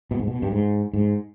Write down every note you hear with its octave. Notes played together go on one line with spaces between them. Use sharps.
B2
G#2
B2
G2
G#2
G#2